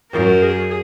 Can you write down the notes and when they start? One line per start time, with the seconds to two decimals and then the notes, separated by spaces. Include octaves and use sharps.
0.12 F#2 A#4
0.42 G#4